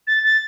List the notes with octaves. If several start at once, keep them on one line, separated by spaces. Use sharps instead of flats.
A6
A6